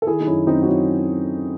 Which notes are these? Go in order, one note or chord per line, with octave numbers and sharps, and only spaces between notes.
A4
D#3 E4 G#4
D#4
F#2 C#4 E4
F#2 C4 D#4
F#4
F#3 C#4 E4